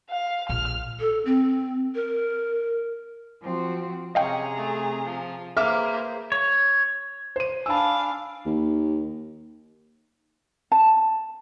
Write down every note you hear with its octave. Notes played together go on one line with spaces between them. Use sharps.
F5
A#1 F6
A4
C4
A#4
F3 C4 F#4
C3 C#4 G#4 D#5 F5 G5 A#5
A3
F3
A#3 G#4 B4 C5 E5 D6 F6
C#5
C5 D#7
D4 F5 G#5 A5 B5 E6
D#2
A5